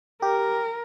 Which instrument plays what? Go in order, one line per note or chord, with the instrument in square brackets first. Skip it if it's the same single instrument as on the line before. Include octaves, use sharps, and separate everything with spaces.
[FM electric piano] G4 [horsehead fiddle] A#4